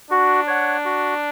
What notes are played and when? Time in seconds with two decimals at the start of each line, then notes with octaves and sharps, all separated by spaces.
0.11 D4 F#4
0.47 C#5 F#5
0.85 F#4